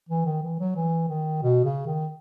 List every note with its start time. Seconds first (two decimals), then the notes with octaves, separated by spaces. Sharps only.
0.09 E3
0.25 D#3
0.42 E3
0.59 F#3
0.75 E3
1.09 D#3
1.42 B2
1.64 C#3
1.86 D#3